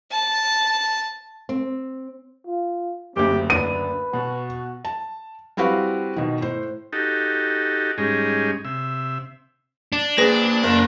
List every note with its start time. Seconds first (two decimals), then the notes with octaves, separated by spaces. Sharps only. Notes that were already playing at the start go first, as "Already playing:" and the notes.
0.11 A5
1.49 C4
2.47 F4
3.16 F#1 D2 C4 G4
3.50 D4 B4 D#7
4.13 B2 F#4
4.85 A5
5.57 G3 C4 E4 F#4 B4 F5
6.16 B2 D#3
6.41 A2 C5
6.93 D#4 F#4 G4 A4
7.98 G#2 G3 G#3 C#4 D#4 G#4
8.65 C3 E5
9.93 D4
10.18 A#3 G#4 B4 C5 A#6
10.63 F#1 A#4 C5